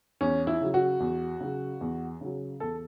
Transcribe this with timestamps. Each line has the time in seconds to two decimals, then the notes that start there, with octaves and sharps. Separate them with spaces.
0.21 E2 C#4
0.47 E4
0.61 C#3 F#3
0.74 F#4
1.00 E2
1.41 C#3 F#3
1.81 E2
2.21 C#3 F#3
2.60 E2 A4